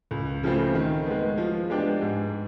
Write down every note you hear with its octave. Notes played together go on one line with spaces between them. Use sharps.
C#2
C#3 F3 A3 C4
D#3
G#3 B3
F3
G#3 B3 D4 G4
G#2